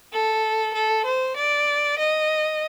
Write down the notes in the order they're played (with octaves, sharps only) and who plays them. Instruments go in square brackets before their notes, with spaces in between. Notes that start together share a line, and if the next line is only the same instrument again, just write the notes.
[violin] A4
A4
C5
D5
D#5